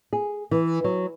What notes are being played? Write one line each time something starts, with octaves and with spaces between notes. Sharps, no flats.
G#4
E3
F#3